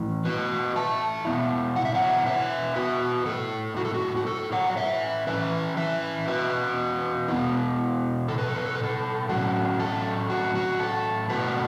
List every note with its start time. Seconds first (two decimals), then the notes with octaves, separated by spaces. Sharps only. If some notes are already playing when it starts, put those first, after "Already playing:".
Already playing: E3 A3 E4
0.25 F#4 B4
0.76 E5 A5
1.25 B2 B3 E4
1.76 F#5
1.85 E5
1.95 C#5 F#5
2.26 B4 E5
2.76 F#4 B4
3.26 A2 A3 E4 A4
3.77 F#4
3.85 A4
3.94 F#4
4.16 F#4
4.27 A4
4.52 C#5 F#5
4.70 C#5
4.77 B4 E5
5.27 E3 C#4 E4 B4 E5
5.77 B4 E5
6.28 F#4 B4
7.28 B2 B3 E4
8.28 A4
8.38 B4
8.47 A4
8.56 B4
8.66 A4
8.75 B4
8.83 A4
9.29 A2 F#3 A3 C#4 F#4
9.79 A4
10.30 F#4
10.55 F#4
10.80 A4
11.30 B2 A3 E4 F#4 B4